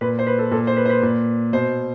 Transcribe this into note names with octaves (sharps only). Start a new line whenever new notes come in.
A#2 B4
C5
B4
A4
A#2 A4
C5
B4
C5
B4
A#2
B2 C5